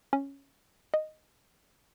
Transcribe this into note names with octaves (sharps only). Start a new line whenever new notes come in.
C#4
D#5